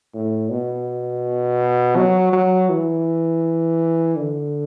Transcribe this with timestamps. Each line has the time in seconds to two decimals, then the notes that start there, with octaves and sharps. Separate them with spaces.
0.14 A2
0.50 B2
1.96 F#3
2.33 F#3
2.69 E3
4.16 D3